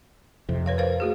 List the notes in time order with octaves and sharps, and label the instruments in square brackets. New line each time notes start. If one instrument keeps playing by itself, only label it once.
[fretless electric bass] F2 C3
[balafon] B4 C#5 F5
A#4 C5 F5
A3 F#4 G#4